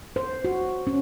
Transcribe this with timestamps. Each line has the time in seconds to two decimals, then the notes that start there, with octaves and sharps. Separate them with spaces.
0.16 C5
0.45 F#4
0.87 C#4